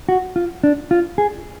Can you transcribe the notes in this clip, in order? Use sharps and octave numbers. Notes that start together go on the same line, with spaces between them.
F#4
F4
D4
F4
G#4